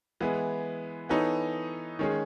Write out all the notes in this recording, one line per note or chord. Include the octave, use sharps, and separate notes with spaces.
E3 G#3 B3 E4
E3 B3 D#4 A4 C#5
D#3 G#3 C#4 G#4